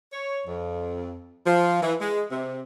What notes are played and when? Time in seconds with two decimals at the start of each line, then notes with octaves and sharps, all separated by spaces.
0.13 C#5
0.47 F2
1.47 F3
1.83 E3
2.01 G#3
2.31 C3